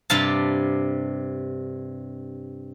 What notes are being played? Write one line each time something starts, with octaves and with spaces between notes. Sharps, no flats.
G2 C3 F5 A5